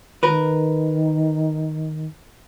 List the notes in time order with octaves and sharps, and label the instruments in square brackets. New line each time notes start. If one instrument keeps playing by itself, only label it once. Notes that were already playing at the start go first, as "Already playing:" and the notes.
[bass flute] D#3 [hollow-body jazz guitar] A#4 B4